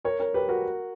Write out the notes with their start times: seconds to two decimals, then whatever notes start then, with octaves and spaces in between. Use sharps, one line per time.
0.04 A#4 C#5
0.20 A#4 C#5
0.34 G4 B4
0.49 F#4 A#4